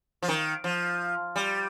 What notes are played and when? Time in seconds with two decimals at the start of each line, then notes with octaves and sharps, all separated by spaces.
0.23 F3
0.28 D#3
0.64 F3
1.36 G3